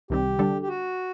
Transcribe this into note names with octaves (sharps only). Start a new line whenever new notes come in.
C2 C3 D#3 G3 C4 G4
D3 G3 D4 A4
G4
F#4